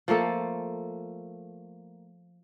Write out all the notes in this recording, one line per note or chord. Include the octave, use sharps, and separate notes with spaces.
F3 A3 A#3 A4